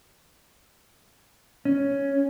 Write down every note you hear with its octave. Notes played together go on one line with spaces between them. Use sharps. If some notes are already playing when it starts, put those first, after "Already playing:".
C#4